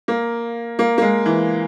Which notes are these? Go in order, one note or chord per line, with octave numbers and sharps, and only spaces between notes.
A#3
A#3
A#3
G#3
E3